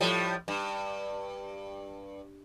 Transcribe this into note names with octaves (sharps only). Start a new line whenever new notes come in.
A2 F3 G3
G2